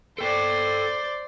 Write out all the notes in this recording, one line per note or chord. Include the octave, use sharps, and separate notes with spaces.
A4 C5 D5 G5